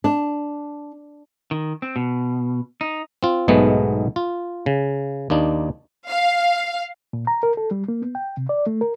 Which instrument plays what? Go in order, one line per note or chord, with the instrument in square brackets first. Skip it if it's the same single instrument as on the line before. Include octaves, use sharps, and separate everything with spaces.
[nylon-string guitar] D4
[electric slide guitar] D#3
C4
B2
D#4
[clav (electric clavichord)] C4 F4
B1 G#2 B2 G#3 A3 B3
F4
C#3
D#2 A#3 D4 D#4
[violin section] F5
[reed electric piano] A#2
A#5
A#4
A4
G3
A#3
B3
G5
C3
D5
A3
A#4